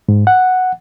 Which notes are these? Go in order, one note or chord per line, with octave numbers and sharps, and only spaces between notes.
G#2
F#5